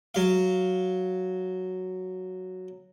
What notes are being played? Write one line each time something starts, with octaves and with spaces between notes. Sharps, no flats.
F#3 F5